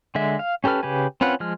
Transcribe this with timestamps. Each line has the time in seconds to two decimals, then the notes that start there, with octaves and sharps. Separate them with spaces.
0.15 D3 G#3 E5
0.39 F5
0.64 C#4 G4 A4 B4 F6
0.83 C#3 G4 B4 G#5
1.21 C4 C#4 F4 B4 F#5
1.40 F3 G#3 F6